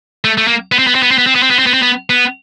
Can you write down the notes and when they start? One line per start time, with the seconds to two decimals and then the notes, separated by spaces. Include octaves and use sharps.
0.24 A3
0.38 A3
0.48 A#3
0.72 B3
0.79 C4
0.87 B3
0.95 C4
1.03 B3
1.11 C4
1.18 B3
1.27 C4
1.35 B3
1.43 C4
1.51 B3
1.59 C4
1.66 B3
1.74 C4
1.82 B3
2.10 B3